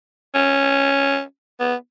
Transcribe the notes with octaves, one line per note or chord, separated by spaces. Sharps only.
C#4
B3